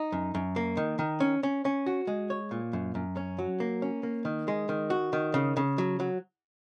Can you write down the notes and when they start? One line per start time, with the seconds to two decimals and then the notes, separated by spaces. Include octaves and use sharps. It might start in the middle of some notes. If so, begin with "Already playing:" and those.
Already playing: D#4
0.12 F#2
0.35 F#2
0.56 A#3
0.77 D#3
0.99 D#3
1.20 C#4
1.43 C#4
1.65 C#4
1.86 F#4
2.07 G#3
2.30 C#5
2.51 A#2
2.73 F#2
2.95 F#2
3.17 C#4
3.38 F#3
3.60 A#3
3.82 C#4
4.03 A#3
4.25 D#3
4.48 G#3
4.69 D#3
4.90 F#4
5.13 D#3
5.34 C#3
5.57 C#3
5.78 F#3
6.00 F#3